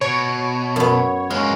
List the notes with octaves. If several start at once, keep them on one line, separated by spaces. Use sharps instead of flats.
B2 C#5
F#2 B3
G#3 A#3 C#4